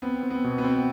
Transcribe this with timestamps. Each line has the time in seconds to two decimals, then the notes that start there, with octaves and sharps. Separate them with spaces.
0.02 B3 C4
0.23 C4
0.30 B3
0.44 B2
0.58 B3
0.64 C4